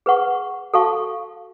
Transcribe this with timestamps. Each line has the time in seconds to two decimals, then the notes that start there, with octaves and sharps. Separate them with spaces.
0.06 G#4 B4 F#5 C#6
0.74 F#4 A4 F5 A5 C#6